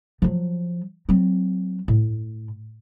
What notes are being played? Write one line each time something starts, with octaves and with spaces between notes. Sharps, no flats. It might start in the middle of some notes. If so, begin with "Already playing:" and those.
F3 F#3
F#3 C4
A2